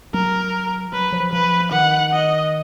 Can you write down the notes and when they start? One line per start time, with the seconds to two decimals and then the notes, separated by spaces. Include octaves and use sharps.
0.14 F#3 A#4
0.93 F#3 B4
1.12 F3
1.33 F3 B4
1.72 D#3 F#5
2.12 D#5